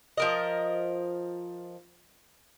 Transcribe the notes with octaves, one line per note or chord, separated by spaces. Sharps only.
F3 A#4 D#5